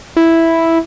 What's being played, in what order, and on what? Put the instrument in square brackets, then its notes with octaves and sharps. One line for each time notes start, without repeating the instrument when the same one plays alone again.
[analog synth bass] E4